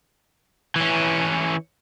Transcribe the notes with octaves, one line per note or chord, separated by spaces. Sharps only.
E3 C#4